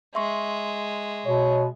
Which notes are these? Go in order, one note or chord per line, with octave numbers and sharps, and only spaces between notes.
G#3 E5 C6 C#6
B2 C#5